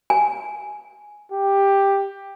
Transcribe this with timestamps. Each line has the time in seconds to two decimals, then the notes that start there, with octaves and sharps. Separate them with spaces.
0.10 G#5
1.32 G4